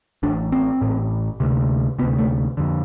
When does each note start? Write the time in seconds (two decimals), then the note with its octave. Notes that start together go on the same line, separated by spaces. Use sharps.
0.23 A1 A2 D4
0.52 C4
0.81 A1 A2
1.40 D2 C3
1.99 C3 B3
2.03 D2
2.19 A3
2.57 F2 D3